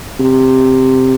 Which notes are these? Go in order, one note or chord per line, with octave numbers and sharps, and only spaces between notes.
C3